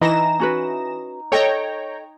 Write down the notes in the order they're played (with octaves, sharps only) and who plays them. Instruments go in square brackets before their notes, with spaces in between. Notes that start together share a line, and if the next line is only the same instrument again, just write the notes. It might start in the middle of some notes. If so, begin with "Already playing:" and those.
[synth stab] E3 A#6 E7 [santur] D#4 [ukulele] D#5
[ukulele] C#4 F#4 B4
[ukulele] A4 D#5 [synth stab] C#5 G5 A#5